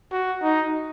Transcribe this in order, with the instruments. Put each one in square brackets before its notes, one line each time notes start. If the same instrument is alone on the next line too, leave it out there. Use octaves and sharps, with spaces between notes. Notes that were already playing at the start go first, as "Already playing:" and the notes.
[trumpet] F#4
D#4